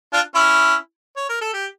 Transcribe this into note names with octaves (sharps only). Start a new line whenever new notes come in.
D4 F4
C#4 E4
C#5
A#4
A4
G4